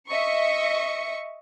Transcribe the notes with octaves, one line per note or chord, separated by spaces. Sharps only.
D#5 E5 C#6 C#7